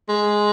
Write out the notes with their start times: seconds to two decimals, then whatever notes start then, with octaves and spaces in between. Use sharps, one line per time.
0.09 G#3